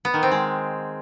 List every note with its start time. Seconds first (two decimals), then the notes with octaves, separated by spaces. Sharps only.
0.05 B3
0.14 D#3
0.23 C4
0.32 G#3